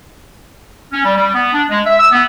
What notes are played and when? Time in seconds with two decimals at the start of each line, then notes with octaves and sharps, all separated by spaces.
0.92 C#4
1.04 G3
1.16 G3
1.35 B3
1.53 D4
1.70 G#3
1.87 E5
1.99 E6
2.12 B3